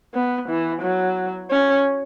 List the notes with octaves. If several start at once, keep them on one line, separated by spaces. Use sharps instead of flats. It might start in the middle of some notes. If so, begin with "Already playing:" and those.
B3
E3
F#3
C#4